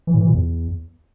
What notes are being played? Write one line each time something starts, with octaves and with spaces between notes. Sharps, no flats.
E3
A2
E3
A#2
E2